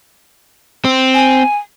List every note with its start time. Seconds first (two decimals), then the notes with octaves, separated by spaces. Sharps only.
0.85 C4
1.14 G#5